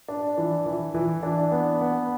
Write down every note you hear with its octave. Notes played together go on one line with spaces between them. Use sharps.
D4
E3
E3
E3
D4
B3
B3